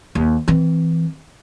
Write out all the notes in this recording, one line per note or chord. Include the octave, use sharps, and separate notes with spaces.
D#2
E3 C4